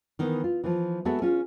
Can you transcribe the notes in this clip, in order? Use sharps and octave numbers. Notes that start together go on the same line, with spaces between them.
D#3 E3 B3
F4
E3 F3
G#3 B3 F#4 G#4 A4 E5
C#4 F4